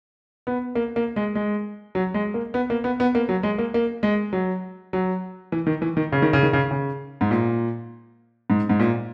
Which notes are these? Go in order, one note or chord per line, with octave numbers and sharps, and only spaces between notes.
B3
A#3
A#3
G#3
G#3
F#3
G#3
A#3
B3
A#3
B3
B3
A#3
F#3
G#3
A#3
A#3
G#3
F#3
F#3
E3
D#3
E3
D#3
C#3
D#3
C#3
D#3
C#3
C#3
G#2
A#2
G#2
G#2
A#2